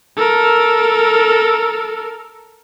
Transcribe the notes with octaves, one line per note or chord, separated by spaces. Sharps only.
A4 A#4